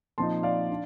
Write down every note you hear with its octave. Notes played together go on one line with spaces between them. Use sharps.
A#2 F3 C4 D#4 A5 C6
D5 F5
D4